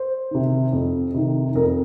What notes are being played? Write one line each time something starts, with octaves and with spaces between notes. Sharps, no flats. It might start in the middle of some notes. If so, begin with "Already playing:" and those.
Already playing: C5
C3 D#3
F2
C3 D#3
F2 A#4